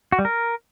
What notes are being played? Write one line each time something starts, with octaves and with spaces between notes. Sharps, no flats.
F#4
G3
A#4